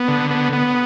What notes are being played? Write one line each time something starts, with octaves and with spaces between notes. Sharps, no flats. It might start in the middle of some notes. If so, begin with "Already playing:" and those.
Already playing: B3
D3
B3
B3